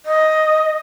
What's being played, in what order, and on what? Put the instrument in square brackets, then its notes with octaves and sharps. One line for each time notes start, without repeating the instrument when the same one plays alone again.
[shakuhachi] D#5